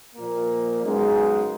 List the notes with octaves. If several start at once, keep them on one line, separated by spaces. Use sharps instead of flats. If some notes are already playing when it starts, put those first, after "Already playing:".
A#2 F3 A#3
F#2 C#3 G#3 B3 D#4